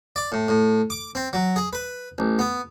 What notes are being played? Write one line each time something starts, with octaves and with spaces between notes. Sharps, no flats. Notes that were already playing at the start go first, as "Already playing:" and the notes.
D5
A2
A2
D6
C4
F#3
G#4
B4
A1
B3